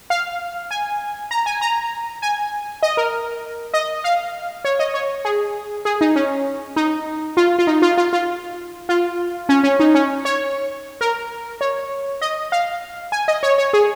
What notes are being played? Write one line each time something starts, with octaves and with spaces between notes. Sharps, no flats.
F5
G#5
A#5
G#5
A#5
G#5
D#5
A#4
D#5
F5
C#5
D#5
C#5
G#4
G#4
D#4
C#4
D#4
F4
F4
D#4
F4
F4
F4
F4
C#4
C#4
D#4
C#4
C#5
A#4
C#5
D#5
F5
G#5
D#5
C#5
C#5
G#4